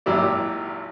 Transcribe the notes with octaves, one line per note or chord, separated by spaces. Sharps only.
G#1 A#2 F#3 E4 G4 D5